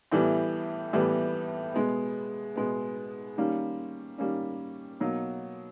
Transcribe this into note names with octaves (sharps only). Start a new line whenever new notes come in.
A2 E3 G3 B3
A2 E3 G3 B3
B2 G#3 B3
B2 G#3 B3
D#3 G3 A#3 C#4
D#3 G3 A#3 C#4
B2 F#3 A#3 D#4